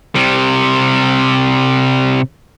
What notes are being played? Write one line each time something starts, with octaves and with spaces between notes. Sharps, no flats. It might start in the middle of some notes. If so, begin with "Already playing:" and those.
C3 G3